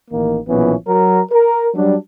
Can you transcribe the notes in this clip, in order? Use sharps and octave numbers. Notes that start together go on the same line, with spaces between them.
A1 D#3 A#3
B1 A#2 E3 F3 B3 C#4
F#3 A#4
A#4
F#3 G3 D4